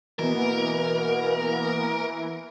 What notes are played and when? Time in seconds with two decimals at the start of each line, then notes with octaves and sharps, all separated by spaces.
0.19 B2 E3 A#3 B3 A#4